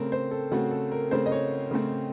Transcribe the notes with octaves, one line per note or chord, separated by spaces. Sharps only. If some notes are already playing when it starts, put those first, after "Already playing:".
Already playing: C#3 A3 C4 A#4
C5
A4
C#3 A3 C4 F#4
A4
A#4
C#3 A3 C4 C5
D#5
C#5
C#3 A3 C4